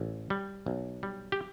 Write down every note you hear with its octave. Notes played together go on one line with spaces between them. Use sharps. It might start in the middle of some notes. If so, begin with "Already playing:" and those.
Already playing: A1
G3
B1
G3
G4